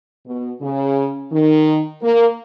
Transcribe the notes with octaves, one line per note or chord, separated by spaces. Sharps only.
B2
C#3
D#3
A#3